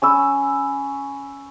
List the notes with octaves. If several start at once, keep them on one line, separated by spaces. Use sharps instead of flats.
C#4 B5 E6